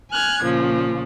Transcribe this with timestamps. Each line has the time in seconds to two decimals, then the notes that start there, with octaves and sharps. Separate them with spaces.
0.11 G#5 F6 F#6 G#6
0.44 A#2 C#3 F3